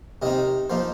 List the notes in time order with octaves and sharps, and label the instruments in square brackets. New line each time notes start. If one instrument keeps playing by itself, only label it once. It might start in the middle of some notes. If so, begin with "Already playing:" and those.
[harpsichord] C3 D#3 C4 D#4 D#5
F3 A#3 D#4 C5